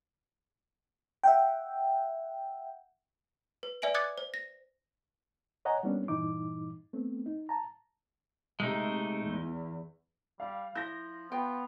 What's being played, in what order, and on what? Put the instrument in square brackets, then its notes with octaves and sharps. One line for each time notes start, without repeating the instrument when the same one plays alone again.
[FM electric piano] E5 F#5 G5
[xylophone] B4
B4 D5 E5 G#5 D7 F#7
D6 D#6 F#6 G#6 A6 C#7
C5
A#6
[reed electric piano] C#5 D#5 F#5 G#5 A#5
G3 A#3 B3 C#4 D4
G2 A#2 E3 D#4 D6
A3 B3 C4
D#4
A5 A#5
[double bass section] C3 [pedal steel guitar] G#3 A3 D#4
[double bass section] E2
[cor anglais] G3 [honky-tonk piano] F5
[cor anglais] F3 [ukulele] E4 [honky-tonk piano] G6 A#6
[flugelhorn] B3 [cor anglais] F4 [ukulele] G5